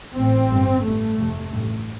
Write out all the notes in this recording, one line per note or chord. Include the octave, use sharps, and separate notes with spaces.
A1 A2 C4
G1 G2
A1 G2 A3
F1 F2 C3
A1 G2